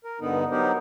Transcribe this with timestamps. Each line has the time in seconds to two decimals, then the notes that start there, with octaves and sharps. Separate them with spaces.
0.04 A#4
0.20 G2 D3 B3 D#4
0.51 F#3 B3 D#4 G4 A#4 C5